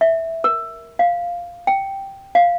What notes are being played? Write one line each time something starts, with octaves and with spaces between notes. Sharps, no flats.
E5
A#4
F5
G5
F5